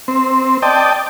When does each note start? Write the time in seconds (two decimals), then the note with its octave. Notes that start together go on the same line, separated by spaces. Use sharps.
0.08 C4
0.62 D5 D#5 G5 A5